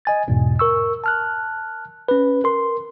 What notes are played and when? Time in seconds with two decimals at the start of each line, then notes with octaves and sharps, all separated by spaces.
0.05 D#5 G#5 A6
0.28 E2 G#2 B2
0.59 A#4 C#6 E6
1.04 A5 F6 F#6
2.08 C#4 B4
2.44 A#4 C6